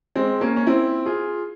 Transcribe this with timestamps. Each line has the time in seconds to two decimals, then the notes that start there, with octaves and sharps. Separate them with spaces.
0.16 G#3 C4
0.41 A#3 C#4
0.56 C#4
0.67 C4 E4
1.06 F4 G#4